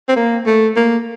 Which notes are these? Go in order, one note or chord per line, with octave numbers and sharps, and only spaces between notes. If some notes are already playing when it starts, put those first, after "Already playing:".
C4
A#3
A3
A#3